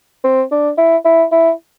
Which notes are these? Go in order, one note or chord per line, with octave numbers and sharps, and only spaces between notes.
C4
D4
E4
E4
E4